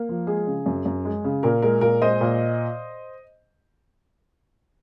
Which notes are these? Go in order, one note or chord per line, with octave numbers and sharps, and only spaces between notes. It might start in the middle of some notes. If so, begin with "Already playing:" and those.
Already playing: A#3
F3
G#3 G#4
C#3
F#2
F#2
G#3
C#3
A#2 A#4
G#3 A#4
A#2 A#4
G#3 C5 D#5
A#2